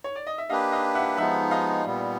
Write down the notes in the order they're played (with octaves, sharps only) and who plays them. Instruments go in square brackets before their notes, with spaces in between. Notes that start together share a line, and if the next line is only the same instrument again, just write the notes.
[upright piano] C#5
D5
D#5
E5
[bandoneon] A#3 D4 G4 B4 [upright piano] D#5 F5
[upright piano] D#5 F5
E5 F#5
[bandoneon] F3 G#3 B3 D#4 [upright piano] E5 F#5
[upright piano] D#5 F5
[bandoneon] A#2 G3 B3